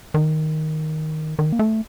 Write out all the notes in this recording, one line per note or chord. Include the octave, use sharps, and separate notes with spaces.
D#3
D#3
A#3
A3